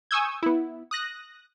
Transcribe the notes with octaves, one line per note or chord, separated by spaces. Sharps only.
G#5 C#6 D#6 E6 G6 G#6
B3 E4
D#6 F#6 A#6